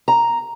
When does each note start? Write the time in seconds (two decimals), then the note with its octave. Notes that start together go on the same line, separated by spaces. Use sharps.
0.08 A#5